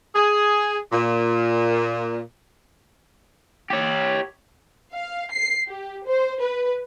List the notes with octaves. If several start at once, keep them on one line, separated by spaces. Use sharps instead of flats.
G#4
A#2
G4 C#5
F5
C7
G4
C5
B4